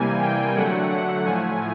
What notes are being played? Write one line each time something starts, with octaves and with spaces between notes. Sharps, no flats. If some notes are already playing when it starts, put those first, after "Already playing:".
Already playing: C3 E3 G3 A#3 G#5
G5
D3 F#3 A3 F#5
F#5
A2 F3 A3 G#5